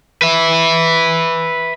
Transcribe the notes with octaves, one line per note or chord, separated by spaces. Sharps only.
B4 E5